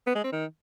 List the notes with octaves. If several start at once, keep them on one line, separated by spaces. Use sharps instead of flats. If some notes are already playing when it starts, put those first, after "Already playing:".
B3
G#3
C4
D#3